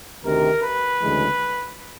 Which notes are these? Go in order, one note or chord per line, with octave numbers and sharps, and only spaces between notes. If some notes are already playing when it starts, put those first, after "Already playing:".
D2 C3 D#3 A#4
B4
D2 C#3 E3 G#3